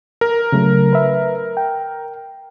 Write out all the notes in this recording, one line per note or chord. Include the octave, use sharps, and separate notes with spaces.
A#4
C#3 F#3 A3
B4 E5
G5